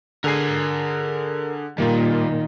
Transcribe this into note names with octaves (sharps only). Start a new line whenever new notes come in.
D3 G#4 A#4 G#5 C7
A#2 D#3 G3 A#3 F4